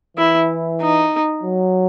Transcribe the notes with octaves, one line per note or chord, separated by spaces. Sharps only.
E3 E4
D#4
F#3